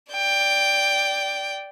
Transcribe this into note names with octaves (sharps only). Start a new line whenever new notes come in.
D5 G5